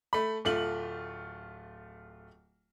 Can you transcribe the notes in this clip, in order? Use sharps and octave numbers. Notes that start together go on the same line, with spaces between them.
A3 B5
D1 A3 F4 F#7